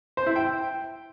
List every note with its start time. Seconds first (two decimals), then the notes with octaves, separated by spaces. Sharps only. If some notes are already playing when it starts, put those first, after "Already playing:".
0.17 C5
0.27 E4
0.36 G5